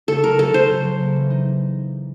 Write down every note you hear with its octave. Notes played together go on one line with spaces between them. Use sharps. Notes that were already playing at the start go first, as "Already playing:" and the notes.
C#3 A4
F#3 A#4
C#3 A4
C#3 C5
C#3
F#3
A#3
E3
D#4